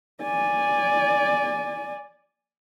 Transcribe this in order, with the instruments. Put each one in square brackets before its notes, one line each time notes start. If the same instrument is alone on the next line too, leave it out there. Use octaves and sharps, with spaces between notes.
[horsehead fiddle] D5 G#5